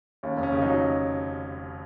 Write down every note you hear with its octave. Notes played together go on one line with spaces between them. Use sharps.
D#2 C#4
F1
C#4
C#3
F#3 D#4